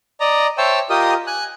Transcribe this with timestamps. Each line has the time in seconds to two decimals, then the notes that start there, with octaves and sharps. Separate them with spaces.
0.20 D5 D#5 A#5
0.58 C5 C#5 E5 G5 A5 E6
0.90 F4 G4 A#4 D#5 D#6
1.27 G#5 F#6